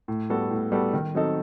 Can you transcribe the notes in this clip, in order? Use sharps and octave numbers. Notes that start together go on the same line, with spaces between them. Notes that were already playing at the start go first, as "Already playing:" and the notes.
A2
G3 B3 F#4 A4
A2
G3 B3 F#4 A4
D#3
F#3 C4 D#4 A4